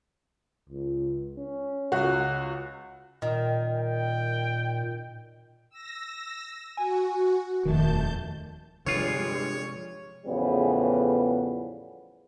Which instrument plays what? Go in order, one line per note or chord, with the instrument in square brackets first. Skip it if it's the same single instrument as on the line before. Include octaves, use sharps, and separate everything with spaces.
[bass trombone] C#2
C#4
[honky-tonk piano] C#2 F#4
[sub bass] A#2 [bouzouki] D#3
[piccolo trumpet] G5
[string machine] E6 A#6
[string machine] F#4 [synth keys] G#5
[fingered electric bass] D#1 F2 [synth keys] D#3 A3 [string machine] A5 G6
[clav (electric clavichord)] G1 F4 [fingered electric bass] C3 F3 [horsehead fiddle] G3 G#3 [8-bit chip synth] C#5
[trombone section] E2 A2 C#3 F3 G3 B3